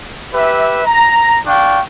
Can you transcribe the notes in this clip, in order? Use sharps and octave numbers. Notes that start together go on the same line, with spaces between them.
G4 B4 E5
A#5
D4 F5 G5 C#6